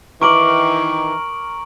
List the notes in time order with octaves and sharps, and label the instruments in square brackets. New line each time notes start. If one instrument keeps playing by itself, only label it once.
[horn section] D#3 E3 [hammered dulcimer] A#4 D6 [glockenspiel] C#6 D7 F#7